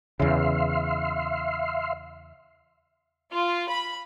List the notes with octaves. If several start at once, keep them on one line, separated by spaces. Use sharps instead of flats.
E2 C#3 E5 F5 C6
F4
B5